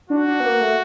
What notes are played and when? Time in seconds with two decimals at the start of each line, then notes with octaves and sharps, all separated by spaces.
0.10 D4 F#4
0.28 D4
0.40 B3
0.45 A#3
0.61 A3